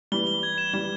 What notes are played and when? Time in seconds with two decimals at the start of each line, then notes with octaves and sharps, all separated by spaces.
0.12 E3 G3 G7
0.27 G7
0.43 G#6
0.58 E7
0.73 E3 G3 G7